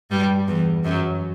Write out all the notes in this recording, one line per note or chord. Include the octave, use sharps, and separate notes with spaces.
G2 G3
E2 E3
F#2 F#3